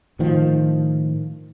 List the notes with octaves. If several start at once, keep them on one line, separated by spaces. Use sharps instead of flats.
A2 D#3 F3